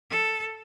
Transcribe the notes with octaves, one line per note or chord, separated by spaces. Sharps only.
A4